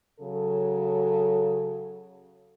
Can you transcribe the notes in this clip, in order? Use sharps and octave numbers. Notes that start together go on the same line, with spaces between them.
C#3 F#3 A4